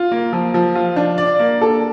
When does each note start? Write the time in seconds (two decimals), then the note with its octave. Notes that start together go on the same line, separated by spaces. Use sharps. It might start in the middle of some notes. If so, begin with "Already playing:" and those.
Already playing: F4
0.12 A#3
0.33 F3
0.54 F3
0.75 F4
0.96 D4
1.18 D5
1.39 A#3
1.61 A4